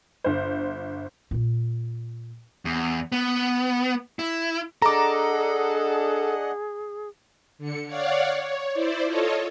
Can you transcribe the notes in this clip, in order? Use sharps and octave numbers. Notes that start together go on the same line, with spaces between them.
G1 C5
A#2 A#3
E2
B3
E4
D4 G#4 A4 D#5 F#5 A#5 D6
D3 C#7
C#5 D5 F5 F#5
C#5
E4 C5 D5
F4 A4 C#5 D#5